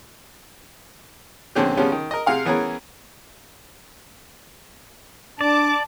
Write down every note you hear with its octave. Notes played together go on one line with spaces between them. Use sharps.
A#1 D3 C4 C#4 G4
C#3 F3 G3 B3 C#4
D#3
A#4 D#5
C3 G#4 F5 F#5
E3 B3 C#4 G#4 A#4
D4 D5 A5 D6